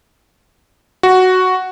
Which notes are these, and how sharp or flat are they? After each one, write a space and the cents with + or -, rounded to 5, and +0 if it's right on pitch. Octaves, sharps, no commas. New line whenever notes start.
F#4 +0